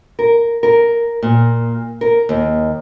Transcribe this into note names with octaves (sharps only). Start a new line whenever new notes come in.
A#4
A#4
A#2
A#4
D#2